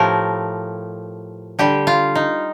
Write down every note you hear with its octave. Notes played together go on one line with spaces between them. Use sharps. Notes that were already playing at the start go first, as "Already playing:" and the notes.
Already playing: A2 F3 A3 G4 A#4
D3 G3 G4
F4
D#4